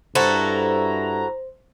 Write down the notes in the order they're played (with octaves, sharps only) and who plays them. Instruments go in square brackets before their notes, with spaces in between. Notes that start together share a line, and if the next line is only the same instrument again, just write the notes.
[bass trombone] G2 [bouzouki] E4 F#4 A4 [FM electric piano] C5 [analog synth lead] A#5